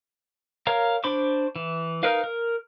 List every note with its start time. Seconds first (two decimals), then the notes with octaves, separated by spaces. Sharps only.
0.67 A#4 C#5 F5 A#5
1.04 D4 C5 B5 C#6 D6
1.56 E3
2.03 D#4 A#4 B4 F5
2.24 A#4